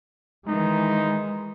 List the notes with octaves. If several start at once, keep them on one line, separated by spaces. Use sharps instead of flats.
D#3 E3 G#3 D#4